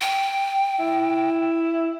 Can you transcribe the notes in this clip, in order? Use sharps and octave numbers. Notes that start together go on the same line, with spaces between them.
G5
E4